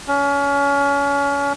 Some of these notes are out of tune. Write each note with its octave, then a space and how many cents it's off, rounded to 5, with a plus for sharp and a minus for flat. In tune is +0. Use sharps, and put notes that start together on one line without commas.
C#4 +30